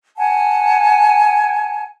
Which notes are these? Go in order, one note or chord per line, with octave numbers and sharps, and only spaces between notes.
F#5 G#5 A5